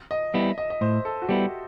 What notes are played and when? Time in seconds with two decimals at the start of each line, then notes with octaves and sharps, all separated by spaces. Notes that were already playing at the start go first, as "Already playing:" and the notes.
0.11 D#5
0.34 G3 B3 E4 E5
0.58 D#5
0.70 D#5
0.81 A2 C5
1.05 A4
1.22 F#4
1.28 G3 B3 E4 G4